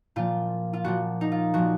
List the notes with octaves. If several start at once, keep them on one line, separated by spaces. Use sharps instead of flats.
A#2 F3 F4
F4
A#2 F3 F#4
D#4
F4
A#2 F3 F#4